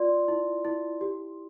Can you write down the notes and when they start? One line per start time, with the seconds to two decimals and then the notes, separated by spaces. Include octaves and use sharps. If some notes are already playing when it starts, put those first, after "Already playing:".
Already playing: F4 D5 C6
0.28 E4
0.65 E4
1.01 G4